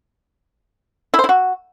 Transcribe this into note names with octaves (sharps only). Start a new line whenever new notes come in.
E4
C5
E4
F#4